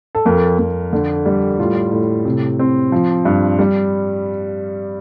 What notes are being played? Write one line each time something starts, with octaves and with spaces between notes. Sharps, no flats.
A4
F2 A#4
F2
D3
G3
A2 F4
A2
C3
C4
F3
G2
G3